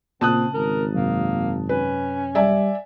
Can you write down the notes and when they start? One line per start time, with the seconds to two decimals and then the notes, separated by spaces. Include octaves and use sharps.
0.21 A#2 C#3 C4 A5 D#6 F#6
0.54 G#1 A#4
0.95 F#2 C3 F#3 A#3
1.69 C#4 B4
2.35 G3 D5 E5 G#5